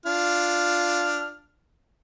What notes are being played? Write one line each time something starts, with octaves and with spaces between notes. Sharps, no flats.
D4 F4 F6